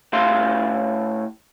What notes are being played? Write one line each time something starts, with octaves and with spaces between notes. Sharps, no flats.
A2 G4 E5 F5 C6